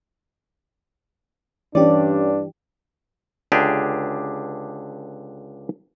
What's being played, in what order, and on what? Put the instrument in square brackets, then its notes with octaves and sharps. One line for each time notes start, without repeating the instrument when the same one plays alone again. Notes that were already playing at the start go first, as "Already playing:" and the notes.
[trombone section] G2 D4 [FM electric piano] E3 G4 [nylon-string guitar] C#4 D5
[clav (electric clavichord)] C#2 D3 D4 G4 G#4